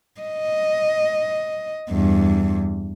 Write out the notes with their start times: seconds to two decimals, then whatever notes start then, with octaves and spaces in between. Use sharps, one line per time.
0.21 D#5
1.90 E2 G2